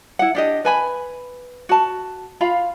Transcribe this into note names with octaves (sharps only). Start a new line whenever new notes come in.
E4 F#5
D4 G4 D#5
B4 G#5 B5
F#4 A5
F4 F5 B5